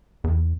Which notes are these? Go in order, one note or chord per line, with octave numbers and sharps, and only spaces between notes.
E2